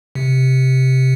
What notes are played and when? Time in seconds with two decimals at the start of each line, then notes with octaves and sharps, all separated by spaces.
0.15 C3